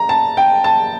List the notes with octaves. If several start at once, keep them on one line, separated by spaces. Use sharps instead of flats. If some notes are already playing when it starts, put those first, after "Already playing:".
Already playing: A#5
A5
G5
A5